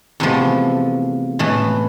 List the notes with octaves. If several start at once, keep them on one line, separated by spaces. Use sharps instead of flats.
E2 C3 F3 A3
A2 E3 A3